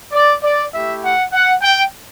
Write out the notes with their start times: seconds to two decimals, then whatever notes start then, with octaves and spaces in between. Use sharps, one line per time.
0.12 D5
0.43 D5
0.72 A3 E4 G4 E5
1.02 F#5
1.33 F#5
1.62 G5